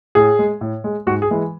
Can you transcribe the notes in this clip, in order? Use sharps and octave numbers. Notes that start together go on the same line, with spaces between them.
A2 G#4
G#3
A2
G#3
G#2 F#4
G#4
E3 G#3